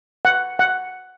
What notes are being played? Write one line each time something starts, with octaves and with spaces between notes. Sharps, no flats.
F#5
F#5